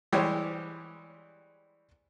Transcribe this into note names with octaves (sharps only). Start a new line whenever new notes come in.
E3 G3 G#3 G4 C5 C#5